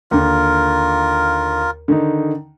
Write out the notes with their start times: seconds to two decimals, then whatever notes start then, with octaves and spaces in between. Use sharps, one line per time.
0.11 D#2 D3 F4 A#4
1.88 D3 D#3 D#4